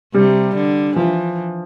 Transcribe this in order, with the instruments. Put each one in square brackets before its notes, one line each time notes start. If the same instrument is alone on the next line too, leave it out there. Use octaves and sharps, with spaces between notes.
[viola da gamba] C3 [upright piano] G3
[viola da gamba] D3
[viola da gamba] E3 [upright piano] F3